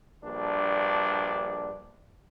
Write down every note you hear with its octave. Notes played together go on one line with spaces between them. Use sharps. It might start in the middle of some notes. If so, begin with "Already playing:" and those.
A#1 G2 D4